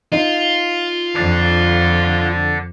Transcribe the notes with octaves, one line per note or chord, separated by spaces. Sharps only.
D#4 F4
F2 A4 D5